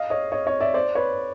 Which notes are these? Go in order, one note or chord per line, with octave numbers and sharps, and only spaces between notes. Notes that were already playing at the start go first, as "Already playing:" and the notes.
Already playing: D#5 F5
C#5 D#5
C#5 D#5
C#5 D#5
D5 E5
C5 D5
B4 C#5